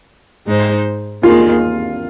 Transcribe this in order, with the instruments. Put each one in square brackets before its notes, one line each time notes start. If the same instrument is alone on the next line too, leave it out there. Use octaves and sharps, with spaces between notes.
[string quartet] G#2 G#3 D#4 C5
[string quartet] D#2 D#3 G#3 [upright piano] F4